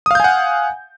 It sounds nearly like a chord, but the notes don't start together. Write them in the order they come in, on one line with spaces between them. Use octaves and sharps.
D#6 F5 G6 G#5 F#5